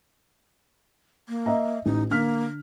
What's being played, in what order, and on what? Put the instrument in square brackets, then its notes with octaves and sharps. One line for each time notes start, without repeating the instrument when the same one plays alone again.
[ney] A#3
[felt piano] D#5 E5 A#5
[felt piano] A1 [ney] D#4
[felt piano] D3 F6 B6 [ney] A#3